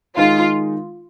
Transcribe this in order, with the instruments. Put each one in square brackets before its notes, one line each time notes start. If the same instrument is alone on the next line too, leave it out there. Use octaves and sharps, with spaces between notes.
[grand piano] D#3 G#3 D#4 [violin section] F4